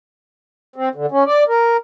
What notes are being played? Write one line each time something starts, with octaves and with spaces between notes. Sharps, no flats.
C4
D3
C#4
D5
A#4